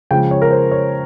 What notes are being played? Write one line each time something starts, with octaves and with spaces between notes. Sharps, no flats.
C#3 F3 G#3 G5
C#5
A#4
C5
C#5